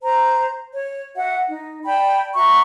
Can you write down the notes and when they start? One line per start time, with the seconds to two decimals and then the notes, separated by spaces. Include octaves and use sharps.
0.02 C5 A#5
0.73 C#5
1.16 F#4 E5 F#5
1.46 D#4
1.86 D5 G5 A5 B5
2.35 F#4 E5 A#5 C#6